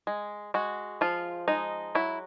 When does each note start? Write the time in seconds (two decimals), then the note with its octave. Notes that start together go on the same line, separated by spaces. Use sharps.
0.07 G#3
0.54 G#3 F#4
1.01 F3 F4
1.48 G#3 D#4
1.95 F#3 E4